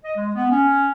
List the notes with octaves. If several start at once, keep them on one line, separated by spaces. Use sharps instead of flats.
D#5
G#3
B3
C#4